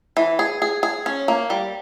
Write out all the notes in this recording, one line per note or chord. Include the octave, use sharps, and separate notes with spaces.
E3
G#4
G#4
G#4
C#4
A#3
G3